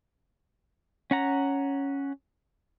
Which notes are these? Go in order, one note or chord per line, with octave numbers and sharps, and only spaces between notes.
C#4 F#5 A#5